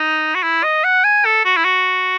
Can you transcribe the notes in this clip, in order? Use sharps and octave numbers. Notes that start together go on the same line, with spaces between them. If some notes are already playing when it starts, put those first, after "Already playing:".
Already playing: D#4
F#4
E4
D#5
F#5
G#5
A4
F#4
E4
F#4